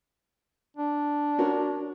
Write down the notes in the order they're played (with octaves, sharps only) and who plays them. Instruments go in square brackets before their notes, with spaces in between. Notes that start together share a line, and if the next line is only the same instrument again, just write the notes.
[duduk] D4
[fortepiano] C#4 F#4 A#4